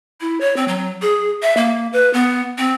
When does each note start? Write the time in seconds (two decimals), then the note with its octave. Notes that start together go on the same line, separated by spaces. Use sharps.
0.21 E4
0.40 C#5
0.56 C4
0.68 F#3
1.02 G#4
1.43 E5
1.57 A#3
1.93 B4
2.13 B3
2.58 C4